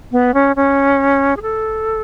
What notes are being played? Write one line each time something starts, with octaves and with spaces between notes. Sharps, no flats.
B3
C#4
C#4
G#4
A4